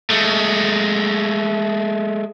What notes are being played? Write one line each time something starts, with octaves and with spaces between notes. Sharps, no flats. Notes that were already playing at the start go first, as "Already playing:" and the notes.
G#3 A3